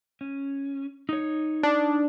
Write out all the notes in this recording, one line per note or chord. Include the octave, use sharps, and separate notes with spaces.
C#4
D#4 C#5
D4